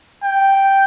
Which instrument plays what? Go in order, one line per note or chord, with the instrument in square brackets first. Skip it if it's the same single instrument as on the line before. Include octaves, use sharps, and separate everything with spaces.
[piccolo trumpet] G5